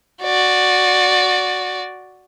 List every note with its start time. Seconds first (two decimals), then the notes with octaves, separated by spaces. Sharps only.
0.23 F#4 D5